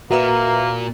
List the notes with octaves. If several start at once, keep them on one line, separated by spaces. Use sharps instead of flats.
A#2 A#3 F#4 B4 E5 A#5